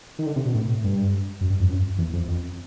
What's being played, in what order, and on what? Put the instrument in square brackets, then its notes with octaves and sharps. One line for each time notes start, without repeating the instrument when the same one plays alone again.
[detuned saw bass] D#3
D3
C3
B2
A2
G2
F#2
G2
F2
F#2
E2
F2
F2